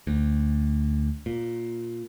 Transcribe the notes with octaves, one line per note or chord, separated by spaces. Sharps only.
D2
A#2